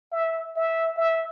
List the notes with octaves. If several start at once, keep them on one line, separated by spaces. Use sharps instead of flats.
E5
E5
E5